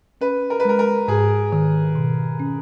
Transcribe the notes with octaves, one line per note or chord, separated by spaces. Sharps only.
C#4 B4
A#4
B4
G#3 A#4
A#4
G#2 G#4
D#3
B2
C#4